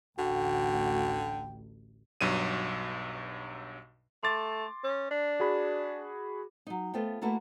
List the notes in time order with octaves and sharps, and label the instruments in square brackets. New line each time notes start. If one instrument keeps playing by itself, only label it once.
[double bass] A1 D2 [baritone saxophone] D3 [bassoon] F#4 [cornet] G5
[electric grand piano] B1 G2 F#3 D#7
[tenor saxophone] A3 [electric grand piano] C6 D6 A6
[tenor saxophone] C#4
D4
[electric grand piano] F#4 G#4 B5
[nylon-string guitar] F#3 D#4
A3 B3 F4 A4 C5 G5
A3 A#3 E4 F#4 A4 B4